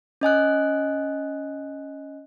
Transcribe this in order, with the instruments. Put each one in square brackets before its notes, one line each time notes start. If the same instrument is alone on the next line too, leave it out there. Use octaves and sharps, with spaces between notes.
[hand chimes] C#4 D#5 G#5 F#6